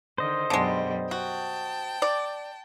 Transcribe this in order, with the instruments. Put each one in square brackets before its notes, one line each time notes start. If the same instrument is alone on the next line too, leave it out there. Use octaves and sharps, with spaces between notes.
[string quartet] D3 D#3 [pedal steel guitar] C5 D#5
[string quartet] F#2 B2 G3 [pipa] D3 G#3
[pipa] F#4 [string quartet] G5 A5
[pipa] D5